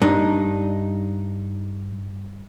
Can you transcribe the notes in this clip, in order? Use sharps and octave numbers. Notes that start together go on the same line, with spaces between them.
G2 D4 D#4